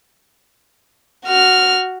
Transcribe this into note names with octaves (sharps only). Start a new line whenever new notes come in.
F#4 F6